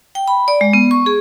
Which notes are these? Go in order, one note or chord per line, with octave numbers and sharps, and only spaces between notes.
G5
B5
D5
G#3
B3
C#6
G#4